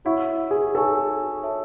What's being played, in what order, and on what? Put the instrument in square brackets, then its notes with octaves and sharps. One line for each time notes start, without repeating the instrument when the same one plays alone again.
[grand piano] E4 [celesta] F#4 C#5 F#5 C#6
[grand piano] G#4
[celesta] D#4 F#4 C#5 G#5 C#6 [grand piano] A4
[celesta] F#4 C#5 E5 A5